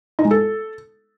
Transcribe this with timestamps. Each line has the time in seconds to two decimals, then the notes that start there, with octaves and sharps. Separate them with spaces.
0.19 D#4
0.25 G#3
0.31 A4